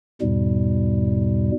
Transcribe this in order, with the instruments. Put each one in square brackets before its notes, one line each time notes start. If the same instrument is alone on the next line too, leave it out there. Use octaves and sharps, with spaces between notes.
[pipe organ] E2 G#2 B2 G3